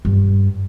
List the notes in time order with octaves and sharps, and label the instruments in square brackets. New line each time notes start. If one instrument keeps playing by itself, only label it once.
[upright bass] G2